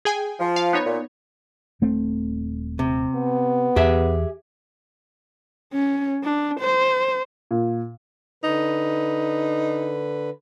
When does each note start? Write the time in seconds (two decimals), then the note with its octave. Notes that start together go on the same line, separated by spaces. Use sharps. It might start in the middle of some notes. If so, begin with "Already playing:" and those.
0.05 G#4 G5 G#5
0.39 F3
0.56 F5
0.73 B3 D#4 C#5
0.86 A#2
1.81 D#1 A3 C4
2.79 C3
3.15 B3
3.76 E2 G4 G#4 E5
5.73 C#4
6.24 D4
6.60 C5
7.51 A#2
8.44 D3 D#4 B4